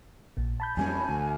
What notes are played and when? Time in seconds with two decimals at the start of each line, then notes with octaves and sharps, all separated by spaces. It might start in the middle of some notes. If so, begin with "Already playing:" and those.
0.37 A#1 A#2
0.60 A5 B5 G6
0.77 F2 G3 C#4 G#5
1.09 D2